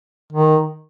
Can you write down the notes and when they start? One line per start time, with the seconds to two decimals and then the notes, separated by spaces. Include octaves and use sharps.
0.32 D#3